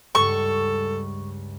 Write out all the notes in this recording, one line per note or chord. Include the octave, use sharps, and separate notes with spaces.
C#2 G2 G#3 A4 C#6